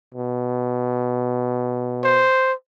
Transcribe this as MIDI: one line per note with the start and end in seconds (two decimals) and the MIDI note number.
0.14 2.28 47
2.04 2.53 72